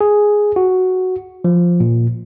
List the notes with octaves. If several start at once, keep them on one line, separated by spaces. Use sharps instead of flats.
G#4
F#4
F3
A#2